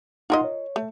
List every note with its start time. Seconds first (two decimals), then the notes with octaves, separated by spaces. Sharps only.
0.30 D#4 F4 A#4 D#5 F#5 C6
0.44 C#5
0.76 A3